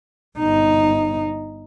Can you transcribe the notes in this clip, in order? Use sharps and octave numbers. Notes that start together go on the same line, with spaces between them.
G1 D#4